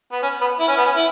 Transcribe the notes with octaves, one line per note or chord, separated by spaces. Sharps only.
B3
C#4
B3
E4
C#4
B3
C#4
E4